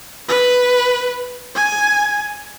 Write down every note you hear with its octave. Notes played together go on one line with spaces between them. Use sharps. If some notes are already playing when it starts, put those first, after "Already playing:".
B4
G#5